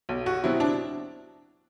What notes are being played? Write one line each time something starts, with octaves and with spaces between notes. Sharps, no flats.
B1
F#4
B2 F#3 C4 E4
D4